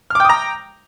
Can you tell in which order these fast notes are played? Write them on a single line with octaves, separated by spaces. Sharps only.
F6 D6 G5 D#6 A#5